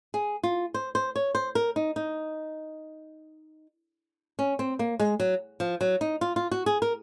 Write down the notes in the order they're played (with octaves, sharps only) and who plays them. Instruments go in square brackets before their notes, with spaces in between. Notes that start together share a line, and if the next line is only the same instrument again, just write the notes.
[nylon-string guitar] G#4
F4
C5
C5
C#5
C5
A#4
D#4
D#4
C#4
C4
A#3
G#3
F#3
F3
F#3
D#4
F4
F4
F#4
G#4
A#4